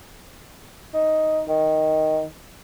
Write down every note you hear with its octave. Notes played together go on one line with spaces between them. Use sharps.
D#4
D#3